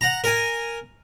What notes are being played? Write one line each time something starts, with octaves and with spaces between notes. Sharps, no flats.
F#5 A#5
A#4 G#5